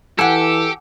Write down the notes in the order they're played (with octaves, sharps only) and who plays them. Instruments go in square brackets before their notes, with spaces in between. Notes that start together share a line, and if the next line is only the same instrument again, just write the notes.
[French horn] E3 [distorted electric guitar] G4 [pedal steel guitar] A4 [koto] F#5 G#5